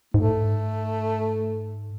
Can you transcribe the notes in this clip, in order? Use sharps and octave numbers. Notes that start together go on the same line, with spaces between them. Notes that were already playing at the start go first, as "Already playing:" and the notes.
G#2 A3